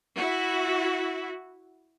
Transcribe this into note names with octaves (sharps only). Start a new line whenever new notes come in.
E4 F#4